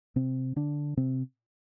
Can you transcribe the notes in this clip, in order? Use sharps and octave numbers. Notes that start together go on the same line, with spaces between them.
C3 C4
D3 D4
C3 C4